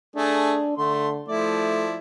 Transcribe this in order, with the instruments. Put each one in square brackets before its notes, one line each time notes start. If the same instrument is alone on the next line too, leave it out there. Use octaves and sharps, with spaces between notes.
[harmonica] A3 G#4 [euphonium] D4
[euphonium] D3 [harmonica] A3 C6
[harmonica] F3 E4 D5 [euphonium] A3